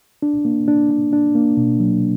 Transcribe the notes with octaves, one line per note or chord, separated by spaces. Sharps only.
D4
A#3
D4
D4
D4
A#3
B2
F#3